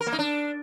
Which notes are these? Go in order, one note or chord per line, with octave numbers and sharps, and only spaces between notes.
A#4
A#3
D#4
D4